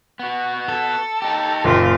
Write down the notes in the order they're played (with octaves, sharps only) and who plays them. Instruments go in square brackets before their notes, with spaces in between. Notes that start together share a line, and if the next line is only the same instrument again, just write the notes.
[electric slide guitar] B3 F#4
[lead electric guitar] A4
[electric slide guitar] D#4 G4
[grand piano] F#1 A#2 [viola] F4